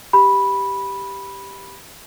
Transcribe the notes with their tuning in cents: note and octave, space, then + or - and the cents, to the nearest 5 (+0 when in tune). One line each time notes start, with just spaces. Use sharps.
G4 +0 B5 -10